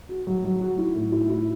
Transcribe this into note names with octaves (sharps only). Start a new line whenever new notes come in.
F#4
F#3
F#3
F#4
E4
A2
E4
E4